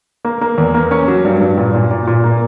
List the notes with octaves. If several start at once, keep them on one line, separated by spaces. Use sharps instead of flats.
A#3
A#3
E2
A#3
C#4
F#3
G2
G2
A#2
A#2
A#2
A#2
A#3